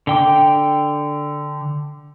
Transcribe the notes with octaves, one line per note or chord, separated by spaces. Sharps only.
D3 G5 D6